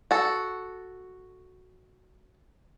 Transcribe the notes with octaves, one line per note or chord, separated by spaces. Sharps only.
F#4 A4